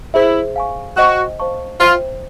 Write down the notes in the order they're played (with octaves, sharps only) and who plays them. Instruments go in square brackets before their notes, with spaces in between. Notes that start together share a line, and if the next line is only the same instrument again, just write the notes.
[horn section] E4 [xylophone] G#4 C5 E5
[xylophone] F5 G#5 C#6
[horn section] F#4 [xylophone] C5 D#5 G5
[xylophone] C5 F5 A5 C#6
[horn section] F4 [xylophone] C5 E5 G5